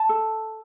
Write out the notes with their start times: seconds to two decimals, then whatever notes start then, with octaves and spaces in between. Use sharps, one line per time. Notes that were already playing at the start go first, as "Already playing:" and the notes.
Already playing: A5
0.09 A4